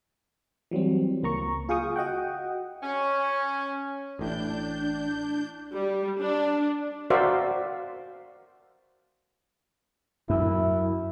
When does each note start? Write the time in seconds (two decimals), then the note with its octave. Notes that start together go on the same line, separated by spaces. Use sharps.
0.71 E3 F#3 G3 C4
1.23 C#2 A#3 A#5 C#6
1.69 F4 G#4 F5 G5 C#6 D#6
1.96 F#4 D#5 F#5 G5
2.83 C#4
4.19 A1 A2 D4 G6
5.73 G3
6.20 D4
7.10 F#4 A#4 C5 D5 E5 F5
10.30 F#2 E4